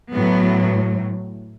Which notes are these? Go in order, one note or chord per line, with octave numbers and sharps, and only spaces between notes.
A2 F#3 B3